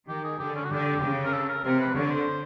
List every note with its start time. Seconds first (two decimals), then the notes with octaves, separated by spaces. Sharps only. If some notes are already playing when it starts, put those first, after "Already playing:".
0.09 D#3 G4
0.24 G#4
0.39 D3 G4
0.56 C#4
0.65 F#4
0.71 D3 G4
1.02 C#3
1.25 A#4
1.33 A4
1.49 A#4
1.64 C3 A#4
1.80 B4
1.96 D3 C#5
2.11 C5